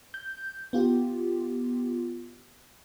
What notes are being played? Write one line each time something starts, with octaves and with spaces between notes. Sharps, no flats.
G6
B3 F4 G4